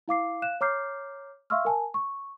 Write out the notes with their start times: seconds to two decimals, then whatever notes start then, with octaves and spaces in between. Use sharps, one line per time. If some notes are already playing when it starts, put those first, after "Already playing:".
0.08 E4 F5 D6 C7
0.42 F5 F#6 E7
0.61 C#5 A#5 D6 F6 G6 C7
1.50 E5 F5 C6 C#6 E6 F6
1.65 A#4 G#5 A5
1.94 C#6